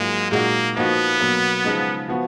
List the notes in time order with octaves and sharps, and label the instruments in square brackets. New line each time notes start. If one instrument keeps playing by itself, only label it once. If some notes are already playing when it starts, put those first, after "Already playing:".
Already playing: [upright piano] G#2 F#3 A#3 F4 [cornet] G#3
[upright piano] A#2 G#3 D#4 F#4 [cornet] A#3
[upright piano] F3 A#3 D#4 F#4 [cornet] B3
[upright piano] B2 F#3 A#3
C#3 F3 G#3 D#4
F3 B3 F#4